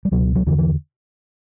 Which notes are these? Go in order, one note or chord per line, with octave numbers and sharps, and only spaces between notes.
G3
C#2 B2 F#3
F#3
E2 D3 E3
E3